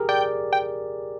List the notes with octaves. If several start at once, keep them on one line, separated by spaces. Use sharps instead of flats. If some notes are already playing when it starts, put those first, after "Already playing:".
Already playing: G4 G#4 A#4
D5 G5
G5